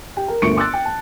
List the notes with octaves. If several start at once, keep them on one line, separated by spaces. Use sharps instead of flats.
G4 G5
A#4
G1 D2 A#2 C#6 C#7 D7
C6 D6 E6 F#6 A6
G5
A5